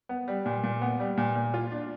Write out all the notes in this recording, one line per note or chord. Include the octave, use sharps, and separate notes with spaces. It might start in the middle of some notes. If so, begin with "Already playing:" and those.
B3
G3
A#2
A#2
B3
G3
A#2
A#2
F4
D4